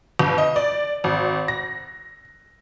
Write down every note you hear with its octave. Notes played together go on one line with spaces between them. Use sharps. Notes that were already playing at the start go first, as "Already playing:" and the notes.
G1
D#5
D5
G#1
A#6